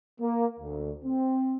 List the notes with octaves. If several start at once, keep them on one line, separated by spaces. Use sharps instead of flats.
A#3
D2
C4